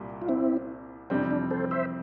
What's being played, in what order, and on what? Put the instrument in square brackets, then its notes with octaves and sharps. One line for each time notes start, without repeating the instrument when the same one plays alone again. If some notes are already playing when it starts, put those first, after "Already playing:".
Already playing: [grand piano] C2 A#2 G3
[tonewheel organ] F4
C4 E4
[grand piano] F2 C3 E3 G3 C4 [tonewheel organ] D4
[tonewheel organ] D4
A4 C5
C5 E5